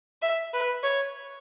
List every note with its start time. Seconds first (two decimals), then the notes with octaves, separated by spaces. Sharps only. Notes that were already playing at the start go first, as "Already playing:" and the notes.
0.22 E5
0.54 B4
0.84 C#5